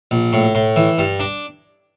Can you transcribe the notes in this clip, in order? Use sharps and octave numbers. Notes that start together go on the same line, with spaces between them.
A#1
A2
A2
E3
G2
D4